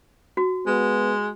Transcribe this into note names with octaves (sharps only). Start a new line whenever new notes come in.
F#4
G#3 B3